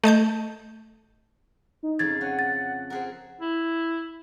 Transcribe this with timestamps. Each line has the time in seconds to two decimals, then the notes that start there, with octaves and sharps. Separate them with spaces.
0.04 A3 D#5 A5 G6
1.83 D#4
1.99 F2 C#3 F5 G#6 A6
2.21 C#4 F#5
2.39 A6
2.90 C4 G#4 A#4 F#5
3.41 E4